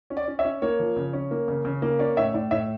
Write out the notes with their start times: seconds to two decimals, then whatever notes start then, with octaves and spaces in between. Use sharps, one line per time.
0.10 C#4
0.17 D5
0.27 C#4
0.39 C#5 E5
0.44 C#4
0.62 A#3 C#5
0.79 F3
0.96 C#3
1.13 C#4
1.31 A#3
1.48 C#3
1.65 C#3
1.82 A#3
1.99 C#4 D5
2.17 A2 C#5 E5
2.34 A2 D5
2.51 A2 C#5 E5